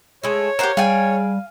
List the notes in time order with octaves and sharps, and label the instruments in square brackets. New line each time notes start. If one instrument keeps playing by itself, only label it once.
[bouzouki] G#3 A3 [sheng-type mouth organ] C#5
[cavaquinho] G4 A#4 [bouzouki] C5 F5 F#5
[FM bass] G3 [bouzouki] G#4 G5 [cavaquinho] F5 G#5